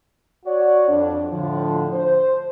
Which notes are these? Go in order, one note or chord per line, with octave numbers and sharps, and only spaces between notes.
F#4 C#5 D5
F2 D4
A2 D3 F3
C5